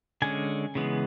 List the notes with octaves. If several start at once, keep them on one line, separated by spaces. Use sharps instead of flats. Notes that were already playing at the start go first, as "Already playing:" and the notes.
D3 G#3 C#4 G#5
C#3 E3 G#3 B3